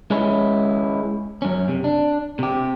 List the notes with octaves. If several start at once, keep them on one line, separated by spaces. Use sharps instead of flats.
G#3 C#4 E4
F#2 C#4
C3
D4
C3 G4